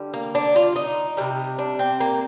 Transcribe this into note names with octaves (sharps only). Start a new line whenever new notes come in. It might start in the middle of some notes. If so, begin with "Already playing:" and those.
Already playing: D3 G3
A#3
D4
F4
D#4
C3 D#3 G3
D4
C4
A#3